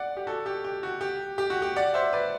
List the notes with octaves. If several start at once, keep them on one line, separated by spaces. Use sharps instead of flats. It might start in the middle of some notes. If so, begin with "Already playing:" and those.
Already playing: D5 F#5
G4
F#4 A4
G4
G4
F#4
G4
G4
F#4
G4
D5 F#5
C5 E5
B4 D5